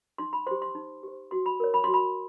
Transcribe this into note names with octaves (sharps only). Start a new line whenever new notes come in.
D#4 C6
B5
G4 C5 C6
C6
D#4
G4 C5
F#4 C6
B5
A#4 C#5
B5
F#4 C6
B5